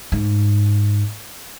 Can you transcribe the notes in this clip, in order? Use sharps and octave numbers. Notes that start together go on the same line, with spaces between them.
G#2